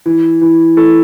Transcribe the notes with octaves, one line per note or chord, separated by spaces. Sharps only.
E3
E3
E3 A4